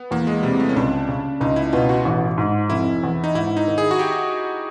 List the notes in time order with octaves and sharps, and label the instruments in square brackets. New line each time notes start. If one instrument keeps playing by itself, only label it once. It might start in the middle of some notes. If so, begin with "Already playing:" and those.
Already playing: [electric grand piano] B3
[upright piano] E2 [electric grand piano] A#3
[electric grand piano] G#3
[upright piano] C3 [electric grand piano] G3
[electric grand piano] A3
C#4
[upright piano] C#2 [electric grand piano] D4
[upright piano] C#3
[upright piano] C#2 [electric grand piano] D#4
[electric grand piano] E4
[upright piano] B2 [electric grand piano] F4
[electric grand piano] F#4
[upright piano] A1
G#2
[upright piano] F1 [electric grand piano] E4
[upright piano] E2
[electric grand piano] D#4
[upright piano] G#2 [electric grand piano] E4
[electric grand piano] D#4
[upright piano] D#3
[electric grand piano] G#4
F#4
G4